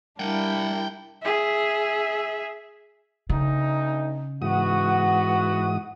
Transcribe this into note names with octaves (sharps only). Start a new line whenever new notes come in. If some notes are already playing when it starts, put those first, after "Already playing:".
G3 D4 E4 A#4 F#5 G5
G#4 E5
D2 C#3 D#4
G#2 E3 B3 F#4 F#5 D#6